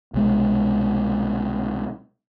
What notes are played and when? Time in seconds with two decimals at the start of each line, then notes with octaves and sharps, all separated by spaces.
0.14 C2 B2 G#3